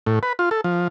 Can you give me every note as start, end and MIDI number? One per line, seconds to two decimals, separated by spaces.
0.07 0.19 45
0.23 0.33 71
0.39 0.49 65
0.51 0.61 69
0.64 0.88 53